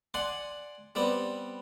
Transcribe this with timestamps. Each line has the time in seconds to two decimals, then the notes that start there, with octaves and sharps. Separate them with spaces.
0.14 D5 F#5 G#5 C6
0.95 G3 B3 C4 D5